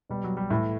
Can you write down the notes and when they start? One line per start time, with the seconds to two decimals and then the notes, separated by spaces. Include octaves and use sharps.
0.10 B2 G3
0.24 F#3
0.37 G3
0.50 A2 E3 A3